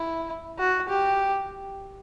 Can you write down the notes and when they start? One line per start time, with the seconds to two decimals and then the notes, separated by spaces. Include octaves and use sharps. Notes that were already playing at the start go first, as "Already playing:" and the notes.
Already playing: E4
0.59 F#4
0.89 G4